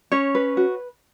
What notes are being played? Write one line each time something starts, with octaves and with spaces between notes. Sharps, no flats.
C#4 C#5
B4
F#4